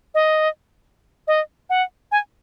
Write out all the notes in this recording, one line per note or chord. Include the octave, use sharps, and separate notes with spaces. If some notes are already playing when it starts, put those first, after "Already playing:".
D#5
D#5
F#5
G#5